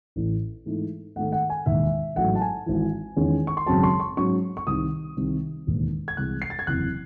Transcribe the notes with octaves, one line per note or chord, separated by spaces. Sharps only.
A1 A2 E3
G#2 E3 A3 D#4
G#2 D#3 A3 D#4 F#5
F#5
G#5
E1 D#2 D#3 E5
A1 G#2 F#3 A3 F#5
A5
G#5
G#1 G#2 E3
E2 D#3 G#3 C#4
C#6
C6
G#1 F#2 C#3 F#3 C4 A5
C6
C#6
G#2 F#3 C#4 C#6
C#6
C2 C3 D#3 D#6
C2 C3 D#3
E1 D#2 D#3
G#6
C2 C3 E3 G#3 F#6
C7
A6
G#6
F#1 E2 C3 E3 C4 F#6